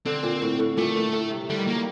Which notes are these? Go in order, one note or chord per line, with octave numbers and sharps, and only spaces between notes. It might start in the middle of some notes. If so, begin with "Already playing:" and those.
D3 C4
A#2
A2
A2
A#2 A3
A2
A2
C3
D3 G3
D#3
F#3 A#3
G3